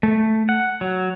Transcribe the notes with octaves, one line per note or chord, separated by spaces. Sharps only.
A3
F#5
F#3